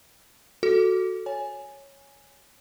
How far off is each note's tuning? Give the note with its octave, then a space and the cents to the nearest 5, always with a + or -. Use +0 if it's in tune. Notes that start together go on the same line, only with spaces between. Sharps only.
F#4 +0 A4 +0
C#5 +0 G#5 +0